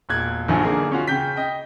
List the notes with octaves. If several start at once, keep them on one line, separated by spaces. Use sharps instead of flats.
E1 A#2 F#6 G#6
A#1 F#2 D3 D#3 F3 F#3
B1 D3 A#3 G#4
C#4 F4 F#4
C#3 G5 G6 B6
D#5 G5